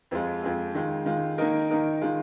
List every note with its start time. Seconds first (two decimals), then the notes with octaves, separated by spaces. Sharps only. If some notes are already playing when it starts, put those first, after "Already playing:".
0.11 F2 F3 G#3 F4
0.43 F2 F3 G#3 F4
0.75 D#3 G#3 F4
1.06 D#3 G#3 F4
1.38 D#3 A#3 D#4 A#4
1.70 D#3 A#3 D#4 A#4
2.02 D#3 G#3 F4